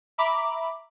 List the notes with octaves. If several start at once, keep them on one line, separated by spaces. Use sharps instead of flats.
E5 A#5 B5 D6